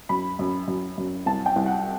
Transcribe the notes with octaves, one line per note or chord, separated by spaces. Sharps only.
F#2 B5
F#2
F#2
F#2
C2 A5
G5
C2
F#5